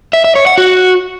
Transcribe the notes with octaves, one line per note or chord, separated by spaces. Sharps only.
E5
E5
C#5
F#5
F#4